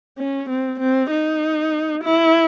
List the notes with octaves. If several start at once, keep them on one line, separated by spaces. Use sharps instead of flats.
C#4
C4
C4
D#4
E4